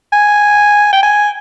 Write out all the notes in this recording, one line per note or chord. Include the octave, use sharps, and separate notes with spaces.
G#5
G5
G#5